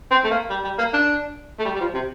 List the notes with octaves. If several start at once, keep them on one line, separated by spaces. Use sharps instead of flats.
C4
A3
A#3
G3
G3
A#3
D4
A3
G3
G3
F3
C3